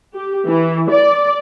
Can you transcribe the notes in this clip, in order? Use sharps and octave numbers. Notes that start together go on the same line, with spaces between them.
G4
E3
D5